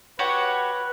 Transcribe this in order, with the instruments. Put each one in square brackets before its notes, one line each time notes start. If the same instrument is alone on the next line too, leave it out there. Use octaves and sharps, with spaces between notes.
[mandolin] F#4 G4 C#5 [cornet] B4